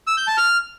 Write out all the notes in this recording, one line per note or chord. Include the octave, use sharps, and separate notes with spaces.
E6
G6
A5
F6